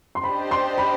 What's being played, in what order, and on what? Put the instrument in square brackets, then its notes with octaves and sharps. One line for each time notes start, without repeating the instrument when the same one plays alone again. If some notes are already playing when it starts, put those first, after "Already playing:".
[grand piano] C6
[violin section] D4 G4 C5 D#5 [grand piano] B5
[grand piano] C6
B5